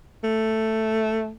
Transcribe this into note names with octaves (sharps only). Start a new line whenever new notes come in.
A3